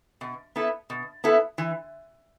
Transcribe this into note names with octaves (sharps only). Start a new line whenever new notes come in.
B2
B3 E4 A4
B2
B3 E4 A4
E3